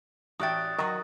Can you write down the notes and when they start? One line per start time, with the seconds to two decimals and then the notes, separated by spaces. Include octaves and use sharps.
0.40 A1 F#4 D5 E5 G5 D#6 F#6 A6
0.79 D#3 F#3 F#4 D#6